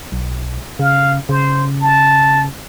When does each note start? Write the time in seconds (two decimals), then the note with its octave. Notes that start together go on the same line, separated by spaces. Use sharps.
0.12 B1
0.79 C#3 F5
1.29 C#3 C5
1.81 A5